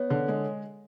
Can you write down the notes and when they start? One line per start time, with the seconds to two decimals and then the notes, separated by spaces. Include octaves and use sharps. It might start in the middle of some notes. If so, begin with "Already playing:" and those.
Already playing: B3 C#5
0.10 D3
0.28 G#3